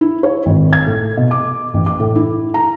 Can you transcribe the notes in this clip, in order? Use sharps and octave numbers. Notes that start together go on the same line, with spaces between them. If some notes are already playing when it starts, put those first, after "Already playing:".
E4
C#5
G#1
G#6
A2
B2
D6
A1
D6
A2
E4
A#5